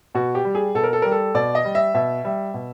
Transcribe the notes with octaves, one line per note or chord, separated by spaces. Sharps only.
B2 F#4
G4
G3
G#4
B2 A4
A#4
A4
G3 A#4
A4
B2 D5
D#5
G3
E5
B2 E5
G3 E5
B2